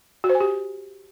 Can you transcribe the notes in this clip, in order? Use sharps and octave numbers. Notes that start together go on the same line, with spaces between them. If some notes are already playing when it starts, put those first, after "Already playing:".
F#4
C5
G#5
G4